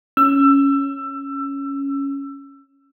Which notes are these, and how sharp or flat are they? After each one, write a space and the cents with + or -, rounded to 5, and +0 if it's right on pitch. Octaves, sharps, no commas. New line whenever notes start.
C#4 +0 E6 +20